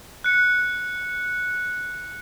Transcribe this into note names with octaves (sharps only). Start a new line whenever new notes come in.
F#6 C#7